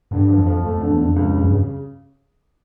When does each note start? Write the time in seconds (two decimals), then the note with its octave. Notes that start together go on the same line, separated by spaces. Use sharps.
0.11 G2 D3
0.29 F3
0.38 F2
0.47 F3
0.63 F2 A3
0.77 F2 D3
0.90 E2
0.99 F2 D3
1.16 C#2
1.33 C#3
1.42 G2
1.51 C#3